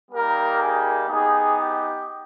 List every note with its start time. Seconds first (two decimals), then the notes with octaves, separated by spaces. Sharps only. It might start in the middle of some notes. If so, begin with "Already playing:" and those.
0.11 G3 A#3 D#4 G4 A#4
0.61 G#4
1.08 B3 D#4 G4 G#4
1.57 G4